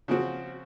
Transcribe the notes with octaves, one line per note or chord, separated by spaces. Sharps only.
C#3 F3 C4 F#4